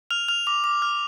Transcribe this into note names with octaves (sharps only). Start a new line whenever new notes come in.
F6 F7
F6 F7
D6 F7
D6
F6